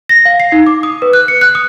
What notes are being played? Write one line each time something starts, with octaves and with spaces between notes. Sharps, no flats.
A#6
F5
C7
D#4
D6
D#6
B4
F#6
C#7
F#6
D#6